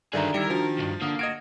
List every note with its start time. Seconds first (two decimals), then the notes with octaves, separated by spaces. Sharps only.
0.13 G2 D3 D#3 F#4 G#4 D5 E5 A#5
0.34 D#3 G3 E4 A#4 C#7
0.50 D#3 F3 D4 F#4
0.78 B1 G2
1.02 D3 A#3 D#6
1.19 F#4 D#5 G#6 D7